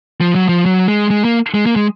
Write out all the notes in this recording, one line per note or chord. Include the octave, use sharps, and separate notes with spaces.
F3
F#3
F3
F#3
G#3
G#3
A#3
G#3
A#3
G#3